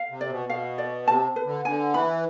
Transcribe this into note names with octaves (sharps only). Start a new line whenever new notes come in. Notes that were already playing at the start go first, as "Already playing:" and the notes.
Already playing: F5
C3
D5
B2
B2 F5
D5
C3 A5
B4
D3
D3 G#5
E3 B5